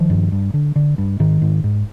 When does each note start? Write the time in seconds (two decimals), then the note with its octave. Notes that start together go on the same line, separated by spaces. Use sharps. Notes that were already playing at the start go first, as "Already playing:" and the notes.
Already playing: D#3 F3
0.10 G2
0.32 G2
0.54 D3
0.76 D3
0.98 G2
1.20 G#2 D#3
1.42 G#2
1.64 G#2